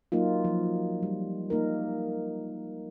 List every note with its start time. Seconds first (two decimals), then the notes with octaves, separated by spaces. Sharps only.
0.12 F#3 A#3 D#4 F4
0.44 F3 F#3
1.03 G3
1.50 A#3 D#4 A#4